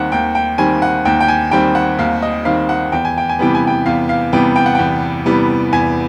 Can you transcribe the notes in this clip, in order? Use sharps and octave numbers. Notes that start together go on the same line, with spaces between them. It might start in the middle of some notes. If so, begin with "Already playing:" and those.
Already playing: D#2 D#3 G3 C4 F#5
D#2 G5
G5
D#3 G3 C4 G#5
F#5
D#2 G5
G5
G#5
D#3 G3 C4 G5
F#5
D#2 F5
D#5
D#3 G3 C4 F5
F#5
E2 G5
G#5
G5
G#5
C3 E3 G3 B3 G5
G#5
G5
E2 F5
F5
C3 E3 G3 B3 G5
G5
F#5
E2 G5
C3 E3 G3 B3
E2 G#5